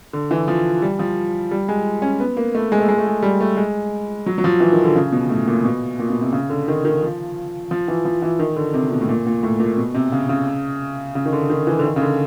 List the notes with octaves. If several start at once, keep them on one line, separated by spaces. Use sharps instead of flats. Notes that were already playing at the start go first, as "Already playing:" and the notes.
D3
E3
F3
G3
F3
G3
G#3
C#4
B3
A#3
A3
G#3
A3
G#3
A3
G#3
G3
A3
G#3
F#3
F#3
F3
E3
D#3
D3
C#3
B2
A2
A#2
B2
A#2
B2
C3
C#3
D3
D#3
D#3
F3
F3
E3
F3
E3
D#3
D3
C3
B2
A2
A#2
A#2
A2
A#2
B2
C3
C#3
C#3
C#3
D#3
D3
D#3
E3
D3
D#3
C#3
D3